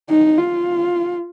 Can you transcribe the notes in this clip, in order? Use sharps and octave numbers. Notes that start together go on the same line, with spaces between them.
D#4
F4